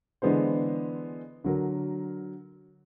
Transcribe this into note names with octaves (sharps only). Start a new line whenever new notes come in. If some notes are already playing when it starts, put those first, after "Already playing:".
D3 E3 G#3 B3 D4 C5
D3 F#3 A#4